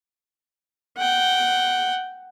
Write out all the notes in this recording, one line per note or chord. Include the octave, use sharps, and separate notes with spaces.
F#5 G5